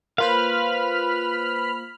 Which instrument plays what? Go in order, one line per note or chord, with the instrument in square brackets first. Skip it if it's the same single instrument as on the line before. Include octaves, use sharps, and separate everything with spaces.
[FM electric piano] A#3 F4 C5 [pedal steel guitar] B4 F5 [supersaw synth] B5 F6